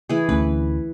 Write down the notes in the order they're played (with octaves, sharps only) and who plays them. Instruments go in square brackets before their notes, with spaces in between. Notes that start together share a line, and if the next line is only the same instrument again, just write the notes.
[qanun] E3 G#4
[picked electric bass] D2 A3 C#4 [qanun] B4